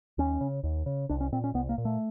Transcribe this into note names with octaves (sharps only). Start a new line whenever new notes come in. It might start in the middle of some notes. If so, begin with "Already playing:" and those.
D#2 C#4
C#3
D#2
C#3
C2 D4
C#4
A#2 C4
C#4
C2 B3
A#3
A#2
A3